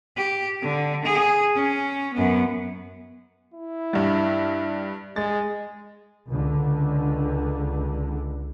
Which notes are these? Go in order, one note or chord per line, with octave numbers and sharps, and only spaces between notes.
G4
D3
G#4
C#4
F#2 B3
E4
G2 G3
G#3 A6
C#2 D3